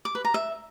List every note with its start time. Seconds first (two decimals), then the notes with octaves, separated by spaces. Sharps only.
0.05 D6
0.15 B4
0.25 A#5
0.34 E5